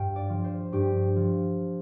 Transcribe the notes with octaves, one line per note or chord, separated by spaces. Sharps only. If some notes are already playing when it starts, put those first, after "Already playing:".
Already playing: G2 F5 G5
D5
F3
C5
G2 G4
F3